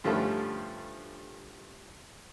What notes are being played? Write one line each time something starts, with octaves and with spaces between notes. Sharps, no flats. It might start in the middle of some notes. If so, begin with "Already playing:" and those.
G2 D3 F3 G3 A3 C#4